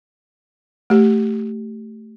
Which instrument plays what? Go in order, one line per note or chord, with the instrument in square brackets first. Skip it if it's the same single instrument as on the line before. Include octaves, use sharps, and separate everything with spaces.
[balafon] A3 G4